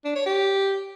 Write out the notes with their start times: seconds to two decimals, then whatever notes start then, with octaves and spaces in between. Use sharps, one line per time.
0.05 D4
0.15 C#5
0.26 G4